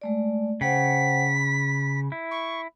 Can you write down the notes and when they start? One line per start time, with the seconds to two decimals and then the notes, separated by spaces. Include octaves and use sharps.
0.02 G#3 A3 D5
0.61 C#3 C5 F#5 G5 B6
1.35 B5
2.12 E4
2.31 C#6